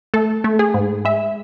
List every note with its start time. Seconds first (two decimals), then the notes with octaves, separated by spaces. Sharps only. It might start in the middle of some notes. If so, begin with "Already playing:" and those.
0.14 A3 A4
0.44 A3
0.59 G#4
0.74 G#2
1.05 G#3 E5